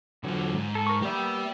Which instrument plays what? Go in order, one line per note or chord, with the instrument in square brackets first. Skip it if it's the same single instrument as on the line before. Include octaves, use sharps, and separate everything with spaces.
[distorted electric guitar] E2 F4 [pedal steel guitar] D3 F#3
[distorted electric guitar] G#2
[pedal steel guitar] A4
A#4 C#6
[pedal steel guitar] A#3 B3 E5 [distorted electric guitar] G4 D5